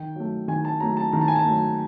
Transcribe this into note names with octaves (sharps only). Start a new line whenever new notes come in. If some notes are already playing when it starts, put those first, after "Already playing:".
Already playing: D#3 G5
F#3 A3
D#3 G#5
A5
F#3 A3 A#5
A5
D#3 A#5
A5
G#5
A5
F#3 A3